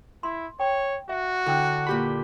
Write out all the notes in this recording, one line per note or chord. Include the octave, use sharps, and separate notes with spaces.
E4 C6
C#5 G5
F#4 E5
D3 E4 G5 E6
A#2 G4 B5